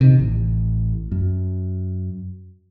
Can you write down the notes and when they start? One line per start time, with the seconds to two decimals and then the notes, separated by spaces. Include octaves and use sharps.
0.01 C3 D#3
0.19 A1
1.12 F#2